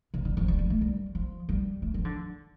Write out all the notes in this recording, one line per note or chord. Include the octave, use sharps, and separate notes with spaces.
C3
D3
F3
G3
G3
A3
G3
F3
G3
A3
F3
D3